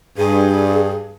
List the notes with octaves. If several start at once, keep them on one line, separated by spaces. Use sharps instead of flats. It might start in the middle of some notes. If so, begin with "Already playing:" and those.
G2 G#4